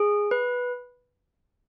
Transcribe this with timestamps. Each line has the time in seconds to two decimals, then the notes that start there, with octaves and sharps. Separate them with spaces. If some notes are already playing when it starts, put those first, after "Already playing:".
Already playing: G#4
0.31 B4